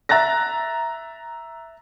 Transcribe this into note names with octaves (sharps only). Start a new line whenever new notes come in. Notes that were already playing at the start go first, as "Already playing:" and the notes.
E5 A#5 F#6 A6 A#6